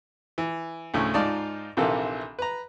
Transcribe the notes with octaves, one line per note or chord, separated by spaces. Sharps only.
E3
D2 A2 C#3
G#2 D#4 F4 D5 A5 D#6
A#1 C3 D#3 E3 A4
B4 A#5